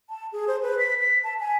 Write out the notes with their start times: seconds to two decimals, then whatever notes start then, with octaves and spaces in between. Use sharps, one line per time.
0.09 A5
0.33 G#4
0.48 C5
0.62 B4
0.79 B6
1.00 B6
1.24 A5
1.40 G#5